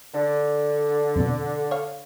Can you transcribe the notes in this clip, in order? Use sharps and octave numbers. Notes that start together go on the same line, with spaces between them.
D3
F2 B2
C#5 F5